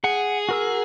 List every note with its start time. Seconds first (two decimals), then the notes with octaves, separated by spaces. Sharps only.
0.04 G#4 F#5
0.49 F#4 A#4 E6